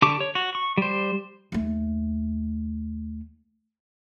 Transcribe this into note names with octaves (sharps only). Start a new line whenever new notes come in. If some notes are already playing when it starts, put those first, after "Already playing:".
D3 G4 A5 C#6 D6
C#5
F#4
C#6
G3 C5
D#2 A3